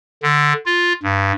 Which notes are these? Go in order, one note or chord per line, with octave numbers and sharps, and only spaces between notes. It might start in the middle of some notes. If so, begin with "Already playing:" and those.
D3
F4
G2